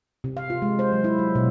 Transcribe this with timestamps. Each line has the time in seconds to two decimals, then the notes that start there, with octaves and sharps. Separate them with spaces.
0.24 C3
0.37 F5
0.50 F4
0.62 G#3
0.79 C5
0.93 F#3
1.04 E4
1.19 F#3
1.35 B2